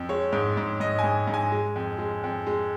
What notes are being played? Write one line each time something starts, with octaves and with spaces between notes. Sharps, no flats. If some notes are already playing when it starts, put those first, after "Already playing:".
Already playing: F2
G#3 C#5
G#2
G#2
G#2 D#5
G#2 G#5
G#2
G#5
G#3
F2
G#3
F2
G#3